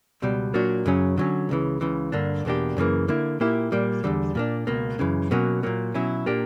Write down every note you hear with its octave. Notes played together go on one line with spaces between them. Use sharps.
C#2 B2 G3
A#2 F#3 A#3 D4 F#4
F#2 C#3 F#3 C#4
D3 F#3 C#4
C#2 C#3 E3
C#2 C#3 E3
G2 D3 A#3 D4
E2 B2 A#3 D4 G4
F#2 C#3 E3 A#3
D3 A#3 E4
A#2 A#3 E4 G4
A#2 G3 A#3
E2 D3 G3
A#2 A#3 D4
C#2 B2 A#3
F#2 C#3 E3
B2 F#3 A#3 C#4
A#2 F#3 A#3
B2 F#3 C#4 E4
A#2 A#3 D4 G4